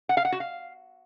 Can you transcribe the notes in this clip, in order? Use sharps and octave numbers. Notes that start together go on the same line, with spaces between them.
F#5
F5
F#5
F#4
F5